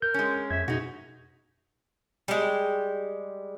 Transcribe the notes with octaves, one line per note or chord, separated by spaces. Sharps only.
A#4 G6
G#3 C#4
F2 E5 G#6
B2 D#4 F#4 G#4
G3 G#3